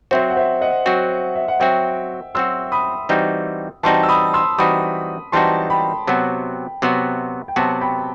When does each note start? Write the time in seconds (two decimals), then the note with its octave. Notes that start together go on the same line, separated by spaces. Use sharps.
0.11 F#3 C4 F#4 C5 E5
0.30 F#5
0.37 C5 E5
0.61 D#5 F#5
0.86 F#3 C4 F#4
1.35 E5
1.48 F#5
1.60 F#3 C4 F#4 E5 G5
2.35 F#3 C4 F#4 C6 E6
2.72 B5 D#6
3.09 E3 G3 C4 D#4 F#4
3.83 E3 G3 C4 D#4 F#4 A5 C6
4.03 E6
4.08 B5 D#6
4.34 C6 E6
4.58 E3 G3 C4 D#4 F#4 B5 D#6
5.32 E3 G3 C4 D#4 F#4 A5 C6
5.70 G5 B5
6.07 C3 F#3 B3 F#4
6.82 C3 F#3 B3 F#4
7.48 G5
7.56 C3 F#3 B3 F#4 F#5 A5
7.81 G5 B5